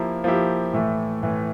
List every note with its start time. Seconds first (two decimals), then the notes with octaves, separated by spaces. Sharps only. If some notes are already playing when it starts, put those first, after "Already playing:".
Already playing: F3 A#3 E4 G4
0.24 F3 A#3 E4 G4
0.73 A2 E3 A3
1.23 A2 E3 A3